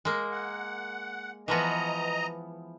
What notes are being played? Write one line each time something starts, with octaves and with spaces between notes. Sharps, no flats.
G#3 A#3
F#5
E3 F3 B3 D#5 A#5